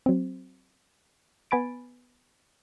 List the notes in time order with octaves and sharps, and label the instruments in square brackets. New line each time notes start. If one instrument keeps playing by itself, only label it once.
[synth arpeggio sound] F#3 C4
B3 G#5 B5 A6 D7